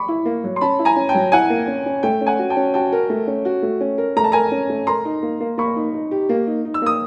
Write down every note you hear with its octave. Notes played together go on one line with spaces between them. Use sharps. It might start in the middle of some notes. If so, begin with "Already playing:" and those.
Already playing: B5 C#6 D6
E4
A#3
F#3
C6
C#4 A5 B5
E4
G#5 A#5
C#4
G5 A5
F#3
E4 F#5 G#5
A#3
C#4
C#4
A3 G5
C#4
F#5 G#5
F#4
G5 A5
C#4
F#4 G5 A5
A#4
A3
C#4
F#4
A3
C#4
A#4
A3 A#5
A5
A#4 G#5 A#5
C#4
A3
A#4 A#5 C6
D#4
A#3
A#3
A#3 B5 C#6
D#4
D#4
G4
A#3
D#4
D#4
E6
A#3 D#6